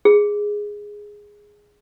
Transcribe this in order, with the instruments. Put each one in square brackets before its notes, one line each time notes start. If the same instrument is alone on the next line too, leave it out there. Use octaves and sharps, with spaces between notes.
[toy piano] G#4